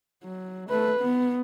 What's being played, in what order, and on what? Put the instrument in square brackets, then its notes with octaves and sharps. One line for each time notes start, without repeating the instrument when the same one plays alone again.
[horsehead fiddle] F#3
A3 B4
B3